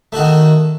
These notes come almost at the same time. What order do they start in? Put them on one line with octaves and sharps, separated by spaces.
A3 F#4 D#3